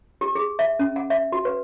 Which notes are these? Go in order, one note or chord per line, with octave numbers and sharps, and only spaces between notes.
G4
G#4
E5
C#4
F#5
E5
F#4
B4